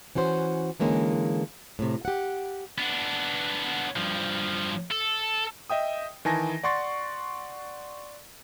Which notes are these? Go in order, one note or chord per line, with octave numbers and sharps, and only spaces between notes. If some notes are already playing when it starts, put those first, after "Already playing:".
E3 C#4 F#4 C5
D3 E3 G#3 A#3 C#4
A2 C3
G4 F#5
B3 D4
G2 F3
A4
D#5 E5 G5 D#6
D#3 E3 G#5 A5 A#6
D5 F#5 C6 C#6 A6